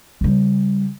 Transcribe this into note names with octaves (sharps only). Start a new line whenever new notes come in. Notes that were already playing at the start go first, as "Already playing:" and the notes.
C#3 G3